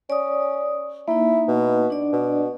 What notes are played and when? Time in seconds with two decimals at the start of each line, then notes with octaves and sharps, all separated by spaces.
0.10 C#4 D5 D#6
1.08 A#3 D#4 E4
1.48 B2
1.90 D4 D5
2.13 B2